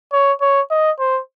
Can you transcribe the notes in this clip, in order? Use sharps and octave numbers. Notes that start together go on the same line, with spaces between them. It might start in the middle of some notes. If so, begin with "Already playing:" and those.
C#5
C#5
D#5
C5